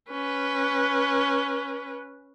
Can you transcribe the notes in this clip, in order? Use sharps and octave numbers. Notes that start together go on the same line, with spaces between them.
C#4 B4